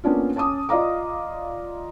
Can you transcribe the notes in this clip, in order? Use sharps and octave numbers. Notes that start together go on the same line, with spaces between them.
A#3 B3 C#4 D4 F4
C#4 A5 D6 D#6
F4 D5 D#5 F5 A#5 D6